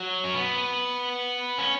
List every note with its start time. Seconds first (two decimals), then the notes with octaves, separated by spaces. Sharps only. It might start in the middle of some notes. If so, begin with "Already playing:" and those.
Already playing: F#3
0.24 C#4
0.35 B3
1.58 C#4